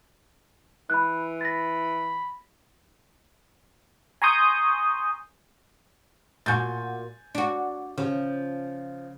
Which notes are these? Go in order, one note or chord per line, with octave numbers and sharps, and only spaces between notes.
E3 B5 F#6
B5 A6 A#6
G#5 A#5 C6 C#6 D#6 G6
A#2 F#4 G#5 G6 A6
D4 F#4
C#3 F3